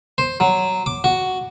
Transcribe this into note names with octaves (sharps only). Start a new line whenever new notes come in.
C5
F#3
D6
F#4